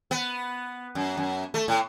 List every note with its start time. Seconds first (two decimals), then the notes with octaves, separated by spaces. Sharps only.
0.11 B3
0.95 F#2
1.17 F#2
1.54 A3
1.68 A2